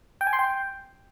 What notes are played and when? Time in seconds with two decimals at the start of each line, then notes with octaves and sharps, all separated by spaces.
0.21 G5
0.27 G#5
0.33 C6
0.39 G5